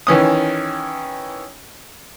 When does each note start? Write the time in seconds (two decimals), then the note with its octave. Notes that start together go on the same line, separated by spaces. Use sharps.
0.07 D#3 E3 C#4 D#6